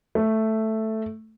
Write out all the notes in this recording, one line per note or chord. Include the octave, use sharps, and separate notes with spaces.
A3